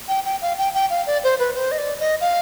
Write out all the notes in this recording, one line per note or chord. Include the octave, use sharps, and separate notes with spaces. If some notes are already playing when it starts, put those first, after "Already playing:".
G5
G5
F5
G5
G5
F5
D5
C5
B4
C5
D#5
D5
D#5
F5